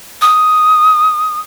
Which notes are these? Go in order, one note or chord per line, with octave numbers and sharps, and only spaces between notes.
D#6